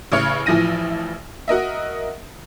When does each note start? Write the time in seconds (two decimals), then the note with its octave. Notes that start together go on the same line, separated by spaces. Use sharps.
0.12 A1 C#3 C#5 F6 C#7
0.46 A1 E3 F3 E4 A#6 D#7
1.48 F#4 A#4 D#5 E5